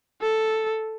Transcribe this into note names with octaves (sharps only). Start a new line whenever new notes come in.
A4